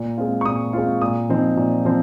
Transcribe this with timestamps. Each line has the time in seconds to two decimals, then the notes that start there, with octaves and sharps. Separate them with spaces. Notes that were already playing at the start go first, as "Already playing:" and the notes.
Already playing: A#2
0.18 G#3 C4 F4
0.41 C#6
0.45 A#2 D#6
0.73 G#3 C4 F4
1.02 A#2 D#6
1.29 F3 C4 D#4
1.57 A#2
1.85 F3 C4